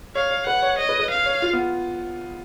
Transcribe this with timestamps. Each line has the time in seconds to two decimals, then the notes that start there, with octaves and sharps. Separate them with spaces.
0.15 C#5 F5
0.31 C#5
0.47 B4 F#5
0.63 C#5
0.78 C#5 D#5
0.89 B4
1.00 B4
1.11 F5
1.26 C#5
1.42 F4
1.53 B3